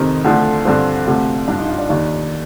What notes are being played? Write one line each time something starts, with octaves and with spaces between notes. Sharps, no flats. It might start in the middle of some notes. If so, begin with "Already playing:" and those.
Already playing: F2 C3 D#3 C4
D2 D3 F3
G2 D3 F3 C4
D2 C3 F3
G2 F3 D4
D#4
F4
D4
D#2 D#3 D4